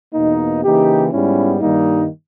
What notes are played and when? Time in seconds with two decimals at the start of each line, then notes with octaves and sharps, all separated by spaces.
0.14 E2 B2 A#3 D#4
0.63 C#3 E3 A#3 D#4 G4
1.11 G#2 G3 B3 C#4 E4
1.60 G2 D#3 G3 A#3 D#4